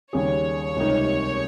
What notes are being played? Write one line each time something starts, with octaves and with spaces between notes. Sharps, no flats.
D#2 C#3 G3 C#4 G#4 C#5
C#2 C3 G3 A#3 D#4